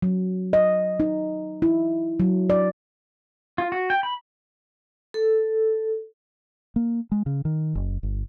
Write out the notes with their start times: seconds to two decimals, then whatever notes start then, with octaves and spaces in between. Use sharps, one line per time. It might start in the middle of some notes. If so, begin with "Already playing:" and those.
0.02 F#3
0.53 D#5
1.00 D#4
1.62 E4
2.20 F#3
2.50 D5
3.58 F4
3.72 F#4
3.90 G5
4.03 B5
5.14 A4
6.76 A#3
7.12 G#3
7.26 C#3
7.45 D#3
7.75 F#1
8.03 G1